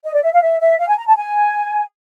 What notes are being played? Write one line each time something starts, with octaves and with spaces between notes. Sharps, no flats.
D#5
D5
E5
F5
E5
E5
F5
G#5
A#5
A5
G#5